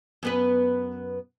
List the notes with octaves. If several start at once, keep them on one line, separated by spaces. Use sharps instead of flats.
F#2 B3 B4